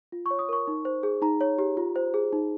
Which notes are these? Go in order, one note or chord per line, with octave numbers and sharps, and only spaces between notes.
F4
C#6
C#5
D#6
A#4 C#6
D#4
C5
G#4
D#4 A#5
C#5
G4
F4
C5
G#4
D#4